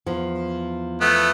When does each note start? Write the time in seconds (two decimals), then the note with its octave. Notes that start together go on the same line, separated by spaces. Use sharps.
0.06 E2 F3
1.01 A3 B3